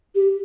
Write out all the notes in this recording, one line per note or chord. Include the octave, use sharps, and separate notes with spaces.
G4